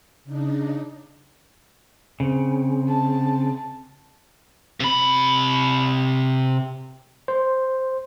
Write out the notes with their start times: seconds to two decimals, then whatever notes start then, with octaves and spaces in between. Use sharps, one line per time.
0.24 C#3 D4 D#4
2.20 C#3 C4
2.88 A5
4.80 C3 B5
7.28 C5